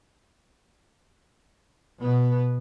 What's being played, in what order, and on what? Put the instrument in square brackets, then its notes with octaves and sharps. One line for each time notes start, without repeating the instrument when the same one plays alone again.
[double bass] B2 B3